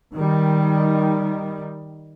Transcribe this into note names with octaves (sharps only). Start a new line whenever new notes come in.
D#3 G3